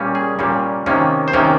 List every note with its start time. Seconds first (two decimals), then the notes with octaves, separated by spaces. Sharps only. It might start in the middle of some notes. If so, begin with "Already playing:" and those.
Already playing: A#2 G3 A#3 C#4
0.15 G#4
0.39 A#2 G3 A#3 C#4
0.86 C3 D#3 A#3 C#4
1.28 C5
1.33 C3 D#3 A#3 C#4 A#4